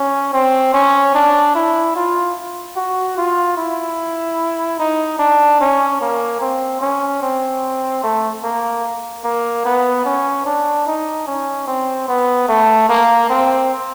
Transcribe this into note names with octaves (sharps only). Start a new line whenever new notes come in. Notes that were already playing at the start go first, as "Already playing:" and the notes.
Already playing: C#4
C4
C#4
D4
E4
F4
F#4
F4
E4
D#4
D4
C#4
A#3
C4
C#4
C4
A3
A#3
A#3
B3
C#4
D4
D#4
C#4
C4
B3
A3
A#3
C4